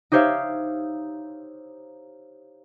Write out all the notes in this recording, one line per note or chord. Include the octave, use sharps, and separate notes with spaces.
D#4 G4 C5 C#5 E5 F5